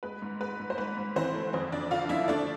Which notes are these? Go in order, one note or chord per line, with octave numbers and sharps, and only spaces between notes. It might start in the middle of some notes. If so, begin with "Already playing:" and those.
G#3 B4
G#2
G#3 B4
G#2
C5
G#2 B4
G#2
E3 C4 C5
A3
F2 C4 C5
F2 D4 D5
D3 F4 F5
F3 E4 E5
A3 D4 D5